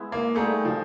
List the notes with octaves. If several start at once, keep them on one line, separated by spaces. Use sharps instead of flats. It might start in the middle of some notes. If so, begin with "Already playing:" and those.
Already playing: G#3 B3 E4
A#3
G3 A3 A#3 D#4 G#4
F3